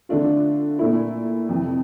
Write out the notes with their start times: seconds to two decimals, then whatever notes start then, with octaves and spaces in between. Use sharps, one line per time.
0.09 D3 A3 D4 F4
0.79 A#2 A3 E4
1.49 F2 C3 E3